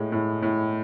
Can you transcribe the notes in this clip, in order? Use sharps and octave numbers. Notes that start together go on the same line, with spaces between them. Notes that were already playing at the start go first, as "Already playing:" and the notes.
Already playing: A2 G#3
A2
A2